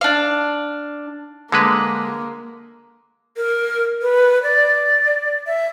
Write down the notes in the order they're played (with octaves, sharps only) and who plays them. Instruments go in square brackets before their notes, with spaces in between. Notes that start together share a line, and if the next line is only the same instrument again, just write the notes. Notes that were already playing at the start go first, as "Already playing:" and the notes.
[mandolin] D4 F5
[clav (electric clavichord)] D3 G#3 B4 [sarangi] A#3
[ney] A#4
B4
D5
E5